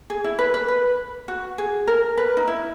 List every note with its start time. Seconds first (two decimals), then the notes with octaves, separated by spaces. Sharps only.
0.10 G#4
0.24 E4
0.39 B4
0.54 B4
0.68 B4
1.28 F#4
1.58 G#4
1.87 A#4
2.18 B4
2.37 D#4
2.47 E4